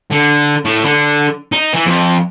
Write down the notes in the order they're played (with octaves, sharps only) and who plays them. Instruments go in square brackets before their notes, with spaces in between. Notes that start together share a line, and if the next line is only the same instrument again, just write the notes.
[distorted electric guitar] D3
A2
D3
D#4
E3
F2